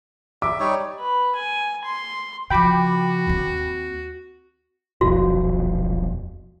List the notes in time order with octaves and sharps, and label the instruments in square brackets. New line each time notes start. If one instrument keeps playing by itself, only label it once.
[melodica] E5 [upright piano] D6
[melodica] G3 D#4 C#5
[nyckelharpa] B4
G#5
C6
[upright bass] C#3 F3 [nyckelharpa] F#4 [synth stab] G5 B5 D6
[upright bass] D#2 C4
[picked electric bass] D#1 B1 F2 [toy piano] F#4